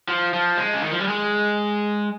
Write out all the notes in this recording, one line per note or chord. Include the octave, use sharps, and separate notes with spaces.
F3
F3
G#3
C#3
D#3
F3
G3
G#3